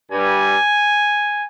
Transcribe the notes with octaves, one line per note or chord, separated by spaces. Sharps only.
G2 G3 G#5